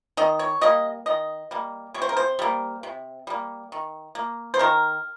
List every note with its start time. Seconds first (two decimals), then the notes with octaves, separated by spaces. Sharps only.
0.17 D#3 D#5
0.39 C#5
0.61 G3 A#3 D#5
1.06 D#3 D#5
1.51 G3 A#3
1.94 C3 C#5
2.02 C5
2.09 A#4
2.17 C5
2.39 G3 A#3
2.83 C3
3.27 G3 A#3
3.72 D#3
4.15 A#3
4.54 C5
4.59 D#3 A#4